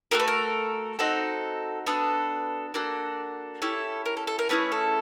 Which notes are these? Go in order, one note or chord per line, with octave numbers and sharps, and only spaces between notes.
A3 D4 F#4 A4 A#4
B4
A#4
C4 D#4 F#4 A4
B3 D4 F#4 A4
A#3 D4 F#4 A4
C#4 E4 G4 A4
A#4
A4
A4
A#4
A3 C#4 E4 G#4 B4
A4